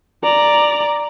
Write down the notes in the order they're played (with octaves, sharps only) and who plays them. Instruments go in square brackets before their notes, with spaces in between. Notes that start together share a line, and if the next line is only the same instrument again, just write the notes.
[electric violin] D5 A#5